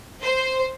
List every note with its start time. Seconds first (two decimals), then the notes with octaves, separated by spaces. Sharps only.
0.22 C5